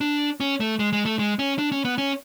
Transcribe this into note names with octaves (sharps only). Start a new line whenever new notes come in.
D4
C#4
A3
G#3
G#3
A3
G#3
C#4
D4
C#4
B3
C#4